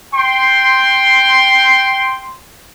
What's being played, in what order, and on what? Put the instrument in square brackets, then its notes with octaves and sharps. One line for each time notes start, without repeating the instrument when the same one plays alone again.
[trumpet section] G5 C6